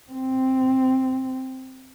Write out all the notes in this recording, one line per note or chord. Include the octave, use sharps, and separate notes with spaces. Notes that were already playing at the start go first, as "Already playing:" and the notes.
C4